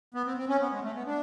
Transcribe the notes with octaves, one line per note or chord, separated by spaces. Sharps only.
B3
C4
C4
C#4
B3
G#3
A3
B3
D4